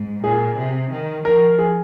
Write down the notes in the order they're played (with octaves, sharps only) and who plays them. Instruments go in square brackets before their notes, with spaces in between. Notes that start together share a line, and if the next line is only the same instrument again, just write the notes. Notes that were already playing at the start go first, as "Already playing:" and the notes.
Already playing: [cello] G#2
[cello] A#2 [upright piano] G#4
[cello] C3
D#3
[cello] F3 [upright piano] A#4
[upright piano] G#4